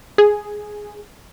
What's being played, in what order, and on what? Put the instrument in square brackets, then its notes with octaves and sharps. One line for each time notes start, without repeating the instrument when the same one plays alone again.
[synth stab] G#4